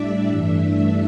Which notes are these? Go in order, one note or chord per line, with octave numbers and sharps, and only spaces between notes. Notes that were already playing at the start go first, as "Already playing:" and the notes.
Already playing: A2 G3 D4 D5 E5
G2 E3 A3 D4 E5